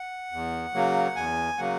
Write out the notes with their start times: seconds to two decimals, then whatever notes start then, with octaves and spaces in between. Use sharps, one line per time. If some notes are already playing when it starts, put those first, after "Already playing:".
Already playing: F#5
0.32 E2
0.74 C#3 F#3 A#3
1.16 E2 G#5
1.58 C#3 F#3 A#3 F#5